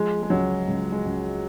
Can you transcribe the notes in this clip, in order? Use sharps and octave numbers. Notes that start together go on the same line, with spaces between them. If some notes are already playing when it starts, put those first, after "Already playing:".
Already playing: F3 G#3
G#3
C#2 F#3
C#2
G#3
C#2